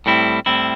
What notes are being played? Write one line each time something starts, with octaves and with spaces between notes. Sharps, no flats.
A2 G3 C4 E4
A2 G3 C4 E4